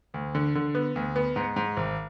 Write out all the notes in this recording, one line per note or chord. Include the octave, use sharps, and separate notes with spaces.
D2
D3
D3
B3
D2
B3
G#2
G#2
G#1